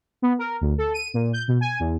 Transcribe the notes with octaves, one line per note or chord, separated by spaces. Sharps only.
B3
A#4
D2
A4
D#7
A#2
G6
B2
G#5
E2